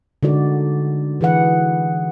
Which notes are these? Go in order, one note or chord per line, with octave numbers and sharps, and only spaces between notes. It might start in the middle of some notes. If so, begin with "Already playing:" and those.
D3 G#3 D#4 F#4 D5
E3 G#4 B4 F#5